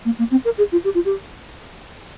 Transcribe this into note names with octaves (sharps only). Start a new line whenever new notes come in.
A#3
A#3
C4
A#4
G#4
F4
G4
F4
G4